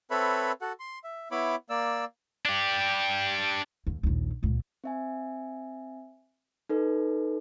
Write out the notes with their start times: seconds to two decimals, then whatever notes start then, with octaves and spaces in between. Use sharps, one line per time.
0.11 C4 A4 B4 C#5 E5 B5
0.61 F#4 A4 F#5
0.80 C6
1.04 E5
1.31 B3 E4 C#5 E5 B5 D6
1.70 A#3 D5 E6
2.45 D4 G4
3.87 D#2
4.03 A#1 D#2
4.43 C#2 A#2
4.84 C4 E5 G#5
6.69 D#4 A4 B4